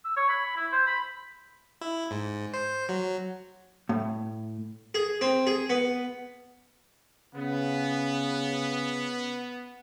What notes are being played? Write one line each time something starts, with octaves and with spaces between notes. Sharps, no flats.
E6
C#5
B5
E4
C5
B5
E4
G#2
C5
F#3
A2
G#4
C4
G#4
B3
C#3 B3